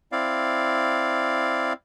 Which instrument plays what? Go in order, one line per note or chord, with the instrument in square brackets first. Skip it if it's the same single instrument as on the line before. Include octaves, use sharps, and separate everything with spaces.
[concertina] C4 E4 D5 F5